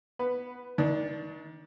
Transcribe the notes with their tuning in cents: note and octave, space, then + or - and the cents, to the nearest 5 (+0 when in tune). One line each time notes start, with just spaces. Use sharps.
B3 +0 B4 +10
D#3 +35 D4 +0